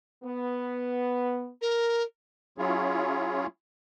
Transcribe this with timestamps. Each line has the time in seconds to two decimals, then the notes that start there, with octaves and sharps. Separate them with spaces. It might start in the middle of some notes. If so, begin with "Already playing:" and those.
0.24 B3
1.61 A#4
2.58 F#3 C#4 E4 F4 G#4 C#5